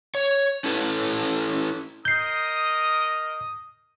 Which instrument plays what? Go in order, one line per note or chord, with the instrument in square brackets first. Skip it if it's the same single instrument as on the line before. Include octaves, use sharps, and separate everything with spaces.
[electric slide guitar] C#5
C#4 E4 A4 B4
[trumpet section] A#4 D#5 [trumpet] D#6 [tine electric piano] G6 C7